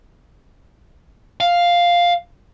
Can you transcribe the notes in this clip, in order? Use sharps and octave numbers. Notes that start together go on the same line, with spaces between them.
F5